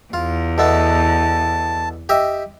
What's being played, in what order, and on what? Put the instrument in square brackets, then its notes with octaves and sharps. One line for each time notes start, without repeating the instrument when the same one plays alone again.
[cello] E2 [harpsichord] F4
[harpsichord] B2 A3 B3 [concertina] A5
[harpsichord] G4 D#5 E5